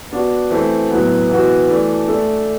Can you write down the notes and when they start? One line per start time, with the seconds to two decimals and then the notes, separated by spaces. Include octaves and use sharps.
0.12 B3 D4 F#4
0.50 E3 A3 C4
0.90 A2 F#3 B3
1.30 E3 B3 F#4
1.69 E3 A3 D4
2.08 A3 D4 A4